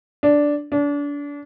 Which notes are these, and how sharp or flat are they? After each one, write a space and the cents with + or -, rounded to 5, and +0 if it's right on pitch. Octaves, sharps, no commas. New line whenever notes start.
D4 -5
D4 -30